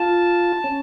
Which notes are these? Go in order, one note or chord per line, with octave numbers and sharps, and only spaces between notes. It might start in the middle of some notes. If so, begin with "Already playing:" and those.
Already playing: F4 A5
C#4